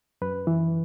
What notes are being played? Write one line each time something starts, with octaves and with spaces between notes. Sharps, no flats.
F#2 B4
E3